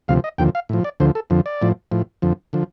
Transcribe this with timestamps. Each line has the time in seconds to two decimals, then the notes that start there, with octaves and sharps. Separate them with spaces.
0.08 D2 C3 F3 F5
0.24 D#5
0.38 D#2 D3 F3 G5
0.55 F5
0.69 A2 F3
0.84 D5
1.00 D2 D3 F3 C5
1.15 A4
1.30 F2 D3 F3
1.46 D5
1.62 A2 F3
1.92 A2 F3
2.22 F2 D3 F3
2.53 D3 F3